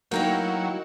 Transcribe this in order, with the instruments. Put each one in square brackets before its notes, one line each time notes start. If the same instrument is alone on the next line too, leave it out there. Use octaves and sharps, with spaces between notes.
[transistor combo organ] F#3 [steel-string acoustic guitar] A#3 D#4 E4 [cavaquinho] A#4 G5